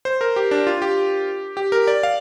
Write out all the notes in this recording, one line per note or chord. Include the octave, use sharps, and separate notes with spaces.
C5
A#4
G4
D4
F4
G4
G4
A#4
D5
F5